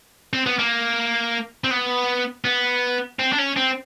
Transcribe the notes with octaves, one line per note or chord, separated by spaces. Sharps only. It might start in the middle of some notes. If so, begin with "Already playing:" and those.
C4
B3
A#3
C4
B3
B3
C4
D4
C#4
C4